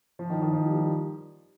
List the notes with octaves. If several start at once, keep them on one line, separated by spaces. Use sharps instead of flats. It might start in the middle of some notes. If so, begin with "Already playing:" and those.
F3
D#3
D#3
F3
G3
G3